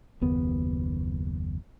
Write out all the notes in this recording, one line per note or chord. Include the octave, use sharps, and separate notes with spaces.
F#1 D#2 B3